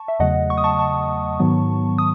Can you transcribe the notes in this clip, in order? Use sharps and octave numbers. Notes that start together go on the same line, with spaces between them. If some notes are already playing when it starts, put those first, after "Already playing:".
Already playing: A5 C#6
E5
E2 C#3 F#3 A3 D#5 F#5
C#6
D#6
A5 C#6
A5 C#6
G#2 D#3 F#3 B3
D#6